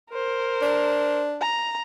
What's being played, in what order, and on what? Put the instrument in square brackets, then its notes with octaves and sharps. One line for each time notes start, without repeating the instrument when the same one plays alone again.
[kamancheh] A#4 C5
[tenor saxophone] D4
[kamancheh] A#5